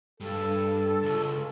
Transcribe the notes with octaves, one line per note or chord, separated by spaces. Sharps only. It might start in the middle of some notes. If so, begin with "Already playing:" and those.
G2 A4
C#2